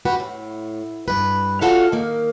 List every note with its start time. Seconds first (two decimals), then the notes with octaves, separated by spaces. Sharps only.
0.05 F#4 G4 B4
0.20 A2
1.08 G2 B4
1.61 F4 F#4 A4 C#5 F5 F#5
1.92 D#3 A#3